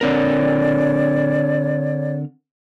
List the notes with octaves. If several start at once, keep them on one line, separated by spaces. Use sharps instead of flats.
D3 C4 A#4 C#5 D5